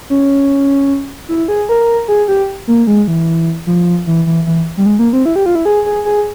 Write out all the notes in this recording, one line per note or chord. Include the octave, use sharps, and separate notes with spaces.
C#4
E4
G#4
A#4
G#4
G4
A#3
G#3
E3
F3
E3
E3
E3
G3
G#3
A#3
C4
E4
G4
F4
E4
G#4
G#4
G#4